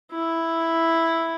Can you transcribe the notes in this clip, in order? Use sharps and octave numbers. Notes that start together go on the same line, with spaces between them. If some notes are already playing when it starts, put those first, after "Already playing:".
E4